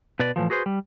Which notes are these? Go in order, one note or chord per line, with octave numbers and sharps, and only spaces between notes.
B2 B4 D5
A2 E3 F3
F#4 G#4 B4 C5
G3